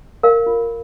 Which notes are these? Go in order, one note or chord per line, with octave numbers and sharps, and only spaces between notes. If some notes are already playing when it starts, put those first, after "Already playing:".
A#4 F5
F4